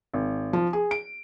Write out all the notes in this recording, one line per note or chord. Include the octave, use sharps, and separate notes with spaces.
G#1
F3
G#4
D7